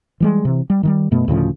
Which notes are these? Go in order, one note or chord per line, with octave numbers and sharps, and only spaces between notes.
E3 G3 G#3
C3 E3
G3
D#3 E3 G3
F#2 B2 A3 B3
D2 A2 C#3 F3